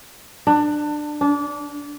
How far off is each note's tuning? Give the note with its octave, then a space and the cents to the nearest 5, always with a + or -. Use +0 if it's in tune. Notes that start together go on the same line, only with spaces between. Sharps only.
D4 +20
D4 -25